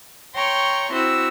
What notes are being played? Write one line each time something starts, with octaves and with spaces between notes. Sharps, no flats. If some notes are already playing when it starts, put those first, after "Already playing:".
C#5 G5 A#5 C6 C#6
C4 E4 F#4 E6